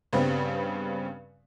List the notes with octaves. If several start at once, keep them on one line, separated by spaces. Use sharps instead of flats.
G2 C#3 G3 B3 C4